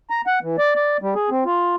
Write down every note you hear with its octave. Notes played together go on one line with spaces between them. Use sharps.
A#5
F#5
E3
D5
D5
G3
G#4
C4
F4